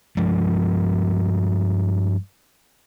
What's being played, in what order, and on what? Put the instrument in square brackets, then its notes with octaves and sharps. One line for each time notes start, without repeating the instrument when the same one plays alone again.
[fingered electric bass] G2 F3 G#3